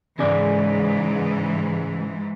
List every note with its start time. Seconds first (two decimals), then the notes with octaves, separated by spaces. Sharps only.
0.19 G#2 C#3 E3 G#4 D5